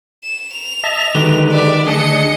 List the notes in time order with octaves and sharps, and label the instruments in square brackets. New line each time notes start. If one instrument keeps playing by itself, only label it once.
[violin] E7
F7
[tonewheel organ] D#5 E5 A5
[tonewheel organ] D3 G#3 B4 [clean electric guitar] D#3 F#3 G4
[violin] D5 E5
[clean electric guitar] D2 [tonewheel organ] D4 G#4 [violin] D#5 C#7